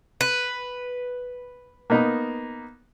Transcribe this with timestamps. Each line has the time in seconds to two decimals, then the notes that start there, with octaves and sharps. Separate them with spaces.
0.21 B4
1.90 A#3 B3 D#4